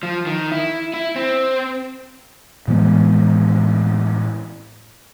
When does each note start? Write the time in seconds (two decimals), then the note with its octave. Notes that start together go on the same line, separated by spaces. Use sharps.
0.03 F3
0.26 D#3
0.52 E4
0.94 E4
1.16 C4
2.68 A2 E3 G#3 B3